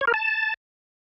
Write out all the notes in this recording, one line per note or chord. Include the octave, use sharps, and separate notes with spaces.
C#5
A#4
A5